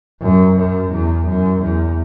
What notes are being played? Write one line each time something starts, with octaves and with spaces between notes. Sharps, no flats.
F#2
F#2
E2
F#2
E2